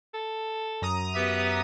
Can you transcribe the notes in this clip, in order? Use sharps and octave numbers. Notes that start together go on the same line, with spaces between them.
A4
F#2 A#5 D#6
B3 G4 B4 E5